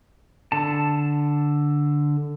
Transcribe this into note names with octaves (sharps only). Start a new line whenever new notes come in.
D3 A5